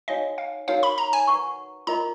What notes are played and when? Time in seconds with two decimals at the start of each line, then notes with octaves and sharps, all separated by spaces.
0.08 D#4 F#4 C#5 D#5 F5 G#5
0.38 F5
0.68 D#4 F#4 A#4 C#5 F5
0.83 B5
0.98 A#5
1.13 G#5
1.27 B4 F#5 A#5 C#6
1.87 F4 A#4 D#5 A#5